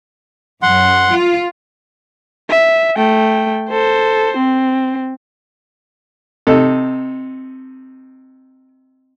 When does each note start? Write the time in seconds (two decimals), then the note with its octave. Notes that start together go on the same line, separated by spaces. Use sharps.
0.62 F#2 F#5 C6
1.12 F4
2.50 E5
2.97 A3 G5
3.70 A4 C5
4.37 C4
6.47 C3 D#4 A4